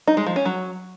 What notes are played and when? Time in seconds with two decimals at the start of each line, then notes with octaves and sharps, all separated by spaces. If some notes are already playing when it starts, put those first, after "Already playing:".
0.07 D#4
0.17 G#3
0.26 F3
0.36 C#4
0.45 F#3